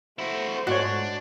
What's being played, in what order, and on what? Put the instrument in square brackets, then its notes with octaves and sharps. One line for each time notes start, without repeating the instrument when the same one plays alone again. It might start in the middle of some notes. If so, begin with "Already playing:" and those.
[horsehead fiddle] A3 C5 [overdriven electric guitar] E4 F#4
[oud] G#2 [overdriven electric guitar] D4 [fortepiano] F#4 C#5